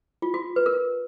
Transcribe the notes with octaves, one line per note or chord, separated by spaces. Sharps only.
F4
F#4
B4
A#4